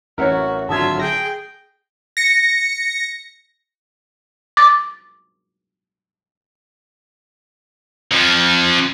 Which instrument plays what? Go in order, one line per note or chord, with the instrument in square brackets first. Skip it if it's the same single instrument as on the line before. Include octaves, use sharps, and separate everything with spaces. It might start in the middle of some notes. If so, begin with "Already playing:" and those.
[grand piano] A1 C#5 [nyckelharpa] F#4 [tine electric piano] A#4 E5 F#5
[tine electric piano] G#1 D3 F#3 [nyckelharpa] F4 E5 [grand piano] A5 D#6 G#6
[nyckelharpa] G#4 G5 [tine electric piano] A#6
[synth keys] A#6 C#7
[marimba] D6 A6
[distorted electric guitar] F2 F3